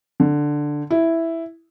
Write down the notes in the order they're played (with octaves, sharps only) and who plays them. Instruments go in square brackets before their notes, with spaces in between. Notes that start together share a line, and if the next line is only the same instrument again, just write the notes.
[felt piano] D3
E4